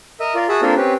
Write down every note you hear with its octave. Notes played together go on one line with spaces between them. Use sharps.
A#4 D#5 E5
F4 A#4 D5
F#4 G#4 E5 A5 B5
A#3 C4 D4 F4 A4 A#4
C4 C#4 G4 B4